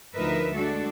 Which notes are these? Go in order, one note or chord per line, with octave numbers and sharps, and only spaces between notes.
D2 F3 D#4 A#4 B4 E5
G#3 D4 F#4 A4